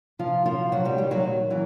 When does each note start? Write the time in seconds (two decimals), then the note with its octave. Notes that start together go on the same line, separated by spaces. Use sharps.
0.19 C3 F3 F4
0.46 F3 F#3 F4
0.72 C3 F#3 F#4
0.85 G3 G4
0.98 D#3 G3 G4
1.11 F#3 F#4
1.25 A#2
1.50 E3 F#3